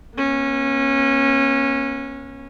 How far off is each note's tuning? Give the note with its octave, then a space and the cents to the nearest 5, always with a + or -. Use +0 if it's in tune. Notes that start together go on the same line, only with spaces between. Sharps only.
A#3 +45 C#4 -20